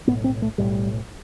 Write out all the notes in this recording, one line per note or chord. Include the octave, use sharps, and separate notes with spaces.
B1 A2 B3
C4
A3
B1 A2 G3